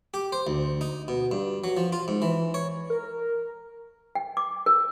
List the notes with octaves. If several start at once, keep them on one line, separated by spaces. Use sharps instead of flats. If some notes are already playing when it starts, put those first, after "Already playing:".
G4
C5
D2
D#4
B2
G2
F#3
F3
F4
G#2
E3
C#5
A#4
G5
D6
A#4